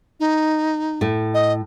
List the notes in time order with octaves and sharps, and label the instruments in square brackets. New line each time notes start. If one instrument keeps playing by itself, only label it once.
[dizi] D#4
[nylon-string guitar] A2 A3
[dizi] D#5